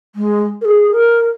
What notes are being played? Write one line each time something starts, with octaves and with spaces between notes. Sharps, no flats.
G#3
A#4
G#4
A#4